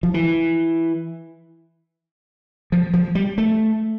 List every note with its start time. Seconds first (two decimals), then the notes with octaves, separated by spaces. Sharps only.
0.03 F3
0.14 E3
2.72 F3
2.94 F3
3.15 G3
3.38 A3